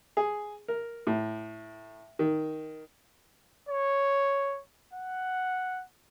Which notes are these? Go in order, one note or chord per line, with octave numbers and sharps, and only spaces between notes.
G#4
A#4
A2
D#3
C#5
F#5